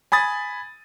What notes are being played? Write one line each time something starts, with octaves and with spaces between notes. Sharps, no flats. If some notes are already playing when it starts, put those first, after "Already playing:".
G#5 B5 D#6 A6